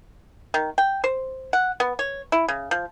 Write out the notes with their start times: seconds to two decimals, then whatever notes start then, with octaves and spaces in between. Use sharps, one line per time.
0.54 D#3
0.78 G5
1.04 C5
1.53 F#5
1.80 B3
1.99 C#5
2.32 E4
2.48 C#3
2.71 F3